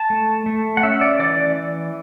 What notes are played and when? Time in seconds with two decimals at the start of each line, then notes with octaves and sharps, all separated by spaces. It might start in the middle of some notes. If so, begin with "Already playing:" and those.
Already playing: A5
0.10 A3
0.46 A3
0.77 F#5
0.83 C#4 E5
1.01 D5
1.19 E3 D5